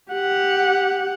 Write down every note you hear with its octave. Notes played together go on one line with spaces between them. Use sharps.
G4 F#5